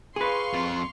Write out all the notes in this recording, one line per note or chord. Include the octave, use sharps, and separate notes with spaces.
G#4 B4 F5 C6 C#6
F2 F4